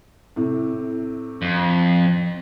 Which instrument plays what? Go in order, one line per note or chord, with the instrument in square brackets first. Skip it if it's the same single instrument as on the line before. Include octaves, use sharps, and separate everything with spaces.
[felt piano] A2 C3
[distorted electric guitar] F2